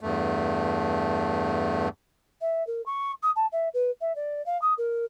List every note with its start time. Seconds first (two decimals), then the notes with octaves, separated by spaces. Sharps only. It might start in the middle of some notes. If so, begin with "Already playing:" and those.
0.01 E2 G2 A3
2.40 E5
2.67 A#4
2.85 C#6
3.23 D#6
3.36 A5
3.52 E5
3.74 B4
4.00 E5
4.15 D5
4.46 F5
4.61 D#6
4.78 A#4